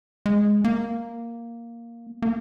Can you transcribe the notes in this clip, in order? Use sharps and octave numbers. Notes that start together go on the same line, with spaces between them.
G#3
A#3
A#3